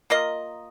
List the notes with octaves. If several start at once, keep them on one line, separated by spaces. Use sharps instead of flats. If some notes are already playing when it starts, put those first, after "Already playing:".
A#3 F4 A#4 D#5